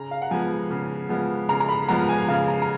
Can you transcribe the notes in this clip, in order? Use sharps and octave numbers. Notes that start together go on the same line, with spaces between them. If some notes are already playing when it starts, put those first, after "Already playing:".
Already playing: C#3 A#5
F5
F#5
F3 G#3 B3 G#5
C#3
F3 G#3 B3
C#3 A#5
A#5
B5
F3 G#3 B3 A#5
G#5
C#3 F5
A#5
A#5